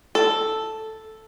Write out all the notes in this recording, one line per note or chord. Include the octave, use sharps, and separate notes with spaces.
A4